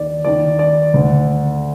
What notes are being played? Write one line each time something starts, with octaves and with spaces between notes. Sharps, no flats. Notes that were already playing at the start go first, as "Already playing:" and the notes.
Already playing: D#2 D#3 D5
D#2 D#3 D5
D5
D2 D3